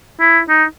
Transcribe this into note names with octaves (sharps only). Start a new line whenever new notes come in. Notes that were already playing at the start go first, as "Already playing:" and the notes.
E4
D#4